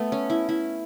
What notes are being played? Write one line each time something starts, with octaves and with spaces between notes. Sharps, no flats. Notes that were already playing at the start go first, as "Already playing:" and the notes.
Already playing: A3 B3
C#4
E4
E4